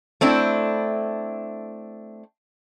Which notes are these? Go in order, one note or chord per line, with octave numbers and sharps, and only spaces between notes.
A3 C4 D4 E4